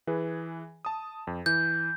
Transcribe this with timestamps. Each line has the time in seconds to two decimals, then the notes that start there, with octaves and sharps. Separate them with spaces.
0.07 E3 G#4 B4
0.85 A5 D#6
1.27 F2
1.46 E3 G6